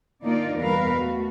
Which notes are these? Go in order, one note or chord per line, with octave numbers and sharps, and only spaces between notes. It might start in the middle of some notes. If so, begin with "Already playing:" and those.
D3 A#3 D#4 F4 D5
E2 B2 G3 A#4 B4 F5
A3 F#4